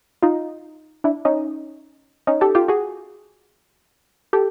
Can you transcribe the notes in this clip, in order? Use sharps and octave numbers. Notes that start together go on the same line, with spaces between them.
D#4 F4
D4 E4
C#4 D#4
C#4 D#4
G4 A4
F4 G4
F#4 G#4
G4 A4